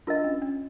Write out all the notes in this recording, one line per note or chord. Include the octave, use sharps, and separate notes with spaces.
D4 F4 A#4 D#5
C#4
C#4